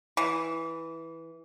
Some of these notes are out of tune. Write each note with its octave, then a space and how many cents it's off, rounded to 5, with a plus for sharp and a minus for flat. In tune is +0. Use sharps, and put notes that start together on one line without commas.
E3 -5